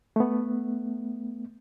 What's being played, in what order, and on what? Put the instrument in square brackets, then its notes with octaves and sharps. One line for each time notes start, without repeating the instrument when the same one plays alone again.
[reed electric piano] A3 B3